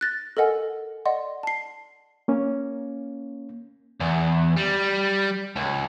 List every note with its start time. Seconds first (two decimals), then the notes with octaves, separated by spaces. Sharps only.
0.01 F#6 A6 A#6
0.37 A4 A#4 D#5 F#5 G#5
1.05 D5 D#5 F#5 C6
1.43 A5 C7
2.28 A#3 C#4
4.00 E2
4.57 G3
5.56 C#2